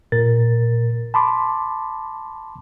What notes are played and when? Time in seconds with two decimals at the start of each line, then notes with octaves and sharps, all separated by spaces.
0.12 A#2 A#4 A6
1.14 A5 B5 C6 D6